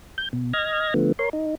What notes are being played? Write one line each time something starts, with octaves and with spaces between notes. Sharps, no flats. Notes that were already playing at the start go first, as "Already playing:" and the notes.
G6
B2
D#5 F6 G#6 A#6
D3 F3 A3 B3
A#4 C#5 C6
D#4